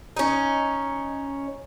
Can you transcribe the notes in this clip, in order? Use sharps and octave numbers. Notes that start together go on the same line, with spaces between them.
C#4 D#4